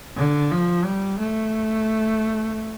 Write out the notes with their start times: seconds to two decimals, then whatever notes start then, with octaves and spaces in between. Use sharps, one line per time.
0.17 D3
0.51 F3
0.85 G3
1.19 A3